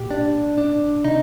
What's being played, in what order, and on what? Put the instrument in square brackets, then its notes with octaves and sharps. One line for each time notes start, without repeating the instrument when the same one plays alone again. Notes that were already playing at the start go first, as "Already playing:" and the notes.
Already playing: [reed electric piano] A#2 [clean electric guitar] G4
[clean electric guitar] D4
D4
[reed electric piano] C3 [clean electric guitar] D#4